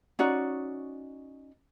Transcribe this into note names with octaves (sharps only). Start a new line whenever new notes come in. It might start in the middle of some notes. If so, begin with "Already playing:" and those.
C#4 D#4 F#4 D5